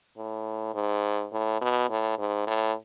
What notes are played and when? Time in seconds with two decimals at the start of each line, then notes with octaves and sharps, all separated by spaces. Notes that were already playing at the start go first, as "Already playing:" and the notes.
0.18 A2
0.75 G#2
1.33 A2
1.61 B2
1.90 A2
2.18 G#2
2.47 A2